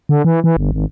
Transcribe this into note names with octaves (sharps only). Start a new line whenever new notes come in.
D3
E3
E3
G1
G#1